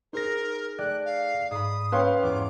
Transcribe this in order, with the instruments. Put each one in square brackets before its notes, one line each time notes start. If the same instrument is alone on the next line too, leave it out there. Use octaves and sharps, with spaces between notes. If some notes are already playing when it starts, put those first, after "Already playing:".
[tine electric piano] D#4 G#4 A#6 [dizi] A#4 [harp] C5 F6
[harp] A3 D5 G5 [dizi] F#6
[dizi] F5
[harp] G#2 B5 [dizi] D#6
[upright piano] C#4 F5 C6 [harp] G4 C#7 [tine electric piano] B4 G5
[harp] E2 G#2 [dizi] D6